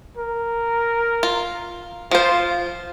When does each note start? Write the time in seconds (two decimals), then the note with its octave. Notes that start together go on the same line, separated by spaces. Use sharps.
0.17 A#4
1.23 F4
2.11 F3 F4 C5